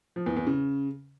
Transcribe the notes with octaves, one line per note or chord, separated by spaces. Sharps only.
F3
E2
E2
C#3